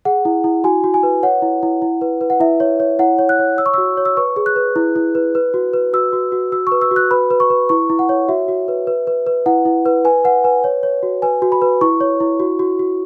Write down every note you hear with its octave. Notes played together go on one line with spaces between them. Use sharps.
G#4 F#5
E4
E4
F#4 G#5
F#4
G#5
B4
C#5 F#5
E4
E4
E4
B4
B4
F#5
E4 E5
C#5
C#5
E4 F#5
C#5
F#6
C#5
C#5 E6
C#6
F#4 E6
C#5
E6
B4 C#6
G#4
F#6
B4
E4
E4
B4
B4
F#4
B4
F#4 E6
F#4
F#4
F#4 E6
B4 C#6
E6
F#4
F#6
B4 B5
B4
C#6
B4
E4 C#6
E4
F#5
C#5
F#4 E5
F#4
B4
B4
B4
B4
E4 F#5
E4
B4
B4 G#5
B4 F#5
B4 G#5
C#5
C#5
F#4
B4 G#5
F#4
B5
B4
E4 C#6
C#5
E4
F#4
F#4
F#4